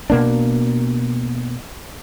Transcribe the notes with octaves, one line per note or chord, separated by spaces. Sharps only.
B2 A#3 D4